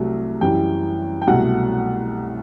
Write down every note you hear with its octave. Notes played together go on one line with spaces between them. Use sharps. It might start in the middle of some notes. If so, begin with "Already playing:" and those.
Already playing: C2 C3 F#3 A3
F#2 E3 G3 G5
G5
C2 B2 F#3 A3 F#5